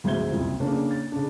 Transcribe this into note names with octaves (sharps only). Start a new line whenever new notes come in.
D2 G#2 C4 E5 G#6 G7
F#1 C2 F2
C#3 A#3 C#4 D4
A6
C#3 D4